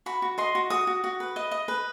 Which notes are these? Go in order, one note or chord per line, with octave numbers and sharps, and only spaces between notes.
F#4 B5
F#4
D#5 C6
F#4
F#4 D#6
F#4
F#4
B4
D#5
D#5
B4